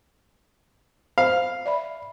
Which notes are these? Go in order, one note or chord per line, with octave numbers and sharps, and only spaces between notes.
C5 F5
D5 E5 B5